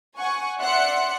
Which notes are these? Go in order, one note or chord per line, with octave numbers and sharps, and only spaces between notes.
F#5 G#5 C#6
D5 E5 F#5 C6 F#6 C#7